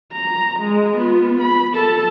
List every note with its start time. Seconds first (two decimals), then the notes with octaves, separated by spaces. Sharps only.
0.13 A#5
0.60 G#3
0.97 B3 F4
1.41 B5
1.74 A4 A5